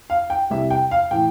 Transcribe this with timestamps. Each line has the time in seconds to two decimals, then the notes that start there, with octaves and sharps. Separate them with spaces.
0.10 F5
0.30 G5
0.50 C2 C3 G3 E5
0.71 G5
0.91 F5
1.11 A2 E3 G5